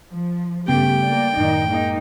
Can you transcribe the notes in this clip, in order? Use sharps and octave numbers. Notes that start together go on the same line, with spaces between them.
F3
G2 C#3 A3 B3 G4 G5
A#3 D5
F#2 A2 D#3 D#4
G#3 A#3 D#4